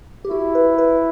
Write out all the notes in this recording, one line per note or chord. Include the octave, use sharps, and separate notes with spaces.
G4
E4 F#4
B4
B4